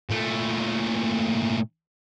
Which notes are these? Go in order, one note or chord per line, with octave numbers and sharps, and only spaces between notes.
A#2 A3